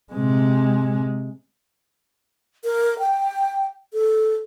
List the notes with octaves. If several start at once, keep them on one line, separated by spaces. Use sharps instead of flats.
C3 G#3
A#4
G5
A4